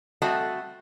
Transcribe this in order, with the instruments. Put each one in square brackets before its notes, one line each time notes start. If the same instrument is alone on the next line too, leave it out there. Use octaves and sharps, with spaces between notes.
[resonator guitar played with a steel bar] G3 A3 C4 F#4 D#5 A5